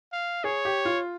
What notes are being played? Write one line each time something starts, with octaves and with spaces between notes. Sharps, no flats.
F5
G#4 C#5
G4
F4